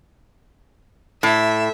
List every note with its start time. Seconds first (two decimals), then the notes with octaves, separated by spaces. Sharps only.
1.23 A2 E5